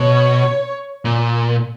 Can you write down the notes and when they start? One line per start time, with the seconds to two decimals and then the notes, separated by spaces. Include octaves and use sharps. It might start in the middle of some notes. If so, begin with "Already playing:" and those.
Already playing: B2 C#5
1.05 A#2